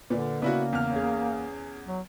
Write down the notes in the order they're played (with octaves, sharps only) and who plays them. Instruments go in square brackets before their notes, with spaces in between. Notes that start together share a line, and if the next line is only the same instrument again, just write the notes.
[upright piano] A#2 [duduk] D3 [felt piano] B4 D5
[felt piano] C#3 D5 [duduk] A#3 [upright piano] B3 E4 F#4
[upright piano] E2 F6
[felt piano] C#4 G#4
[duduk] F#3